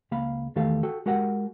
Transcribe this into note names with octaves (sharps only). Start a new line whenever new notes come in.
C#2 A#3 F5 B5
E2 D#3 A3 G4 A4 F5
F#4 A4 G5
G#3 F#4 G4 A#4 F#5